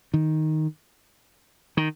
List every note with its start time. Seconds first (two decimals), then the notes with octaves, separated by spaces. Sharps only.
0.14 D#3
1.77 D#3